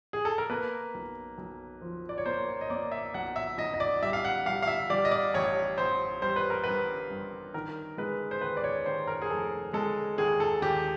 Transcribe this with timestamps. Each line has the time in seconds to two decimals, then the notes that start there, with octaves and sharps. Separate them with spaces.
0.13 G#4
0.25 A4
0.38 A#4
0.50 A#3 B4
0.94 B1
1.38 B1
1.81 F3
2.09 D5
2.18 C#5
2.26 A#3 C5
2.48 C#5
2.61 D#5
2.70 A#3 D5
2.92 E5
3.14 B1 F#5
3.36 E5
3.57 B1 D#5
3.74 D#5
3.80 D5
4.02 G3 E5
4.13 F5
4.25 F#5
4.45 G3 F5
4.63 F5
4.67 E5
4.90 G3 D5
5.05 D#5
5.11 D5
5.34 A1 C#5
5.78 A1 C5
6.22 G3 C5
6.36 B4
6.50 A#4
6.64 G2 B4
7.10 G2
7.54 D#3 A#4
7.98 G#3 B4
8.31 C5
8.41 D#2 B4
8.57 D5
8.64 C#5
8.86 D#2 C5
9.07 A#4
9.22 G#4
9.30 F1 A4
9.73 G#3 A4
10.18 D#2 G#4
10.40 A4
10.62 D#2 G4